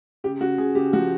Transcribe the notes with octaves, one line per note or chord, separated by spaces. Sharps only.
C#3 G4
C#3 F#4
C#3 G#4
C#3 G4
F3 F#4